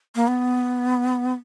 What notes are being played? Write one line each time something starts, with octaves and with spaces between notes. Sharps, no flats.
A#3
B3